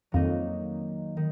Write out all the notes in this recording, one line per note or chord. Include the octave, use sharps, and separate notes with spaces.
F2 D#3 F#3 A#3 D#4
D#3